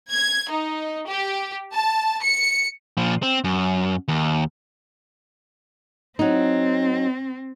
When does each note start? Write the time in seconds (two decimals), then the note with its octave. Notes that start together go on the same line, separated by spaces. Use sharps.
0.11 G#6
0.49 D#4
1.08 G4
1.72 A5
2.22 C#7
2.97 A#2 F3
3.23 C4
3.44 F#2
4.08 D#2
6.19 F#3 C4 D#4